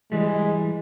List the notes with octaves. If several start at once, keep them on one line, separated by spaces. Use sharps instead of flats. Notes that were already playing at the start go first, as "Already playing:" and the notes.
E3 G3 G#3